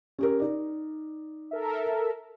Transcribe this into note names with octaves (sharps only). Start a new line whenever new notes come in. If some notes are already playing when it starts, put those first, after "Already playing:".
C#4 G4 A#4
D#4 D5
A4 A#4 E5